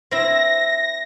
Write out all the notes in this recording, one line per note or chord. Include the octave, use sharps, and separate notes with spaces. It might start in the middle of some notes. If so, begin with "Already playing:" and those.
C4 E4 A#6